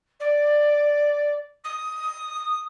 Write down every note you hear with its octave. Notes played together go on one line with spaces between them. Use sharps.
D5
D#6